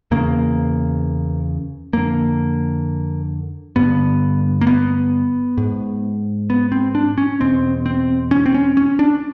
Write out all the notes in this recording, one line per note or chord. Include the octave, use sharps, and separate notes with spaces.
E2 C#3 A#3
F2 D3 A#3
G2 D3 B3
A#3
B3
G#2
B3
C4
D4
C#4
E2 B2 C4
C4
C#4
C4
C#4
C#4
D4